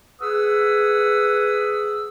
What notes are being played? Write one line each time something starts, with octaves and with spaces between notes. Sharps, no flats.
G#4 B4 F#5 D#6 E6